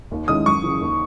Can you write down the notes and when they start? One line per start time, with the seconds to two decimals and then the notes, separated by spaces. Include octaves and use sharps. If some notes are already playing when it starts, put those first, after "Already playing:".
0.11 D#2
0.28 D#3 G#3 C#4 E4 D#6
0.46 F#2 C#6
0.63 C#3 E3
0.81 D#2